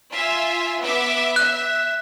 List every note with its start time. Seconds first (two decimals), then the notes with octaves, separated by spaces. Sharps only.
0.12 F4 E5 G#5
0.81 B3 E5 D6
1.36 E5 F#6